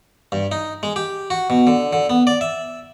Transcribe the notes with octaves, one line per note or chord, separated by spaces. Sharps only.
G2
D#4
G#3
G4
F#4
B2
D3
D3
B3
D5
E5